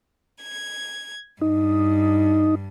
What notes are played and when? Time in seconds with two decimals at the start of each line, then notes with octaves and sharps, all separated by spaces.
0.41 G#6
1.41 G2 D#4